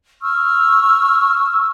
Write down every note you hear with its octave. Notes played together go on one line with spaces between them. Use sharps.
C#6 E6 F6